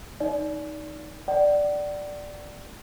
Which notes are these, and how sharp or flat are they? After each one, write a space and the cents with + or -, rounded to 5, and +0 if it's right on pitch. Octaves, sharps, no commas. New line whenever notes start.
D#4 +0 D5 -25
D5 +0 F#5 +40